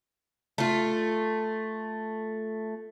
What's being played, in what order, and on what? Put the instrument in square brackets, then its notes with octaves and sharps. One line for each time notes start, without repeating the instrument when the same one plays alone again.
[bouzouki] A3 F4